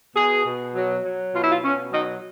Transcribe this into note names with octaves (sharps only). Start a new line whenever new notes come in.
B2 G#4
B2
F#3
F#3
B2 F4
E4
F4
B2 C#4
F#3 D#4